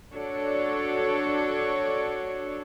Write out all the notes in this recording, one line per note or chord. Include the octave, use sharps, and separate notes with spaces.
D4 F#4 A4 C#5 D5